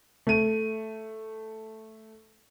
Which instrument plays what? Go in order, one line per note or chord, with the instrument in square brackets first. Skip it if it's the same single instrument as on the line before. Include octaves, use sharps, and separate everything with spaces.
[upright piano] A3 D#7